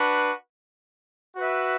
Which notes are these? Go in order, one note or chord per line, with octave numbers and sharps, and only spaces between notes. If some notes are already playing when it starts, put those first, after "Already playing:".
Already playing: D4 F#4 B4
F#4 B4 E5